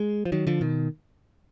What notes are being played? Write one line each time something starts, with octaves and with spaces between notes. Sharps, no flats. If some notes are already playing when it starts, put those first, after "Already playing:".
Already playing: G#3
F3
D#3 F#3
D3 F3
B2 D#3